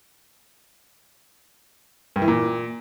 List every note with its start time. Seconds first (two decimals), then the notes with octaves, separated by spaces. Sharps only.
2.16 G2
2.22 E3
2.28 A#2